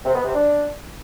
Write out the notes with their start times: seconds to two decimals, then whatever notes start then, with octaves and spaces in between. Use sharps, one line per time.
0.05 C3
0.15 B3
0.25 C3
0.34 D4